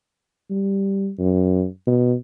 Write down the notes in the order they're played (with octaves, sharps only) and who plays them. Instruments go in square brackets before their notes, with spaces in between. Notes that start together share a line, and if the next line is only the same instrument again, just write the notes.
[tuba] G3
F#2
B2